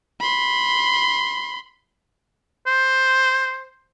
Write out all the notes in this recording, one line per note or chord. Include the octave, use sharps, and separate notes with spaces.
B5 C6
C5